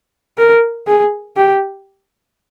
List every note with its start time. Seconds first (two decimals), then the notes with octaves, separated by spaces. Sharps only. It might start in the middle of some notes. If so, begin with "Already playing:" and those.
0.38 A#4
0.87 G#4
1.37 G4